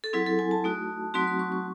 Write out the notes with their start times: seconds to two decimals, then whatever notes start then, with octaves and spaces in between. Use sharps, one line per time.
0.04 A4
0.13 F#3 C4 E4 G#4
0.26 A4
0.39 G#5
0.51 A5
0.64 A3 D#4 F#4
1.14 F#3 A3 C4 D#4 F#4 C6
1.27 C6
1.39 C#6
1.52 C#6